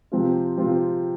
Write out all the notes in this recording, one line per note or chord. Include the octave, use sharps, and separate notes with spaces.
C3 F3 C4 F4
C3 F3 C4 F4